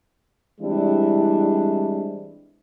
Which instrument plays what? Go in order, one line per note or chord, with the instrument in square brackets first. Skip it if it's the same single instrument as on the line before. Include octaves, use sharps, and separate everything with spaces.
[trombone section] E3 G3 G#3 C4 D4 E4